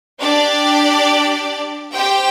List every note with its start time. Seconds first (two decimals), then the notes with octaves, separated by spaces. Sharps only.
0.20 D4 G4 D5
1.92 G4 C5 G5